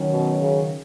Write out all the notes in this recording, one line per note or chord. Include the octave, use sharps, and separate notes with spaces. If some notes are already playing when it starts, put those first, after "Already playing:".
Already playing: D#3 F#3 C#4
B2
C#3